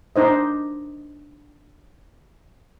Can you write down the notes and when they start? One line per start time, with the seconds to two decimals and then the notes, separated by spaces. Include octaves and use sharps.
0.16 D4 D#4 C5 D#5